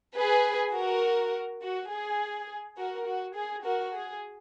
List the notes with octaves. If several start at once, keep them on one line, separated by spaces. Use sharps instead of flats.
G#4 B4
F#4 A#4
F#4
G#4
F#4 A#4
F#4
G#4
F#4 A#4
G#4